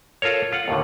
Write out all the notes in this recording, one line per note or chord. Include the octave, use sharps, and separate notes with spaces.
F4 A4 A#4 C#5
F4 F#5
D#2 A2 D3